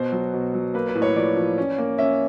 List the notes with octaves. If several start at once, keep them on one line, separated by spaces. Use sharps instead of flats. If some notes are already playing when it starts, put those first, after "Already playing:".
Already playing: B2 C5
F#3
B2
F#3
A#3 B4
B4
A2
C#5
F3 D5
F3
C#4
A#3
C#4 E5